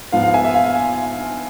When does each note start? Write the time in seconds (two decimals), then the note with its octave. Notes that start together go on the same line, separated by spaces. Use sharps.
0.12 G#2 F3 B3 F5
0.23 F5
0.34 E5 G#5
0.44 E5
0.54 F5
0.64 F5